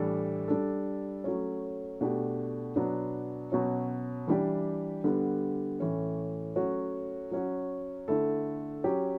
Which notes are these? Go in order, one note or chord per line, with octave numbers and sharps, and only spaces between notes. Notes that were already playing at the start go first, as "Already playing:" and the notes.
Already playing: A2 E3 G3 D4 A4
G3 D4 A4
F#3 A3 C#4
B2 A3 D4 G4
B2 F#3 B3 D4
B2 F#3 C#4
E3 G3 D4 G4
D3 G3 B3
A2 E3 A3 C#4
F#3 A3 C#4 F#4
F#3 C#4 F#4
D3 A3 E4 A4
F#3 C#4 G4